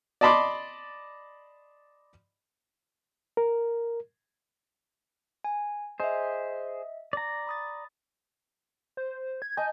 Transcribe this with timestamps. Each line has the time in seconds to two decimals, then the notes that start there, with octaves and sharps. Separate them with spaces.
0.21 D5 D#5 A5 B5 C6 D6
3.37 A#4
5.44 G#5
6.00 G#4 C5 D#5 E5
7.13 D5 A#5
7.47 B5 D#6 A6
8.97 C5
9.42 G#6
9.57 D#5 G#5 A5 G6